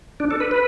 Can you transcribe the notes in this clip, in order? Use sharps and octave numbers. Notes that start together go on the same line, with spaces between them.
D4
A4
B4
B4